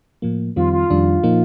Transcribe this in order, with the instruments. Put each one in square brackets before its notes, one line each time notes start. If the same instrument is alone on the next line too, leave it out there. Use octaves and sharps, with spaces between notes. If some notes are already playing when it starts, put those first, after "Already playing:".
[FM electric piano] A2 F3 A#3
[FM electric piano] F2 D#3 G3 C4 [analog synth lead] F4
[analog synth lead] F4
[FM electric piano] F2 D#3 G3 D4
A#2 F3 A#3 D#4